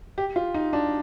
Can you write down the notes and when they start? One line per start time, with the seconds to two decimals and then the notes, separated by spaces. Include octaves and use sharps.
0.18 G4
0.36 F4
0.54 D#4
0.73 D4